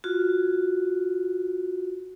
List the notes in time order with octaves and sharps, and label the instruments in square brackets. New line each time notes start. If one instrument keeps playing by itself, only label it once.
[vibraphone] F4 F#4